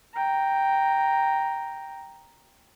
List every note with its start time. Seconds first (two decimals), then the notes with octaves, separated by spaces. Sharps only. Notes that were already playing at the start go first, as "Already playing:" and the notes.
0.14 G5 A#5